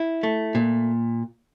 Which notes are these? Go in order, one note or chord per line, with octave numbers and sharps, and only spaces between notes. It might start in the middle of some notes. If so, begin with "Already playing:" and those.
Already playing: E4
A3
A#2